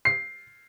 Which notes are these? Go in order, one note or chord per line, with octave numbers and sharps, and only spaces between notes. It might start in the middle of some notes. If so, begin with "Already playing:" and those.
C7